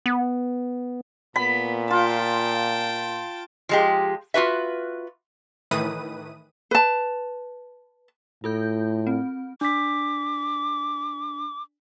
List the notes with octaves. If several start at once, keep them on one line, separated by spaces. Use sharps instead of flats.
B3
A#2 B3 B5
F4 G5 A5
F3 G#3 G4
F4 F#4 B4 E5
A2 D#3 E3 B4 D#6 D#7
B4 A5
A2 F4 A4 G6
C4
D4 D6 B6